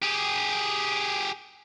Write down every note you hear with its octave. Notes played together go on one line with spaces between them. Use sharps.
G4 G#4